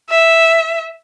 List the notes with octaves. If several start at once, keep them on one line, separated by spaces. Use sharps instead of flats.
E5